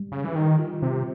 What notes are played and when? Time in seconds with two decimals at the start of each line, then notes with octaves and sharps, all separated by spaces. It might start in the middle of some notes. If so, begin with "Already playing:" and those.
Already playing: G3
0.12 C#3
0.24 E3 G3
0.35 D#3
0.59 F4
0.82 C3
0.94 C4